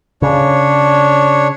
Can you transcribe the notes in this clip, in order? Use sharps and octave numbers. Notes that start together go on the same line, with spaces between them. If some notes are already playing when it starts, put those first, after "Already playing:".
C#3 D4 C#5